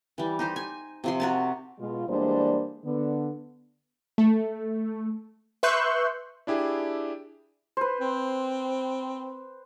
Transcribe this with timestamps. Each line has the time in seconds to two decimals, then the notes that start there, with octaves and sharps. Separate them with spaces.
0.18 E3 G3
0.39 D#4 G4 C5
0.56 G#5
1.04 C3 F3 C6
1.20 F#4 A#4 A5
1.79 B2 G#3 F4
2.08 E2 G3 G#3 A#3 D4 C5
2.85 D3 B3
4.18 A3
5.63 B4 E5 C6 C#6 F#6 G6
6.47 D4 E4 G4 G#4
7.77 B4 C5
8.00 C4